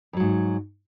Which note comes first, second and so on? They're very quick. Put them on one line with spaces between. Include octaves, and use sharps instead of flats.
F2 F#3 G#2